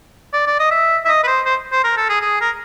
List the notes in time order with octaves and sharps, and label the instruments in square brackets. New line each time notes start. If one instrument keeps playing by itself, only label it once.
[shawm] D5
D5
D#5
E5
E5
D#5
B4
C5
C5
C5
A#4
A4
G#4
G#4
A#4